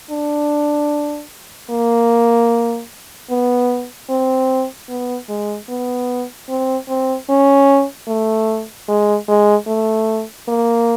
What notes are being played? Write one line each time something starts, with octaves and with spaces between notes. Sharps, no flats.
D4
A#3
B3
C4
B3
G#3
B3
C4
C4
C#4
A3
G#3
G#3
A3
A#3